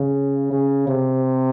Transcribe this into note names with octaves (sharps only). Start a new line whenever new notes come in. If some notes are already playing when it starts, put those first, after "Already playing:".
Already playing: C#3
C#3
C3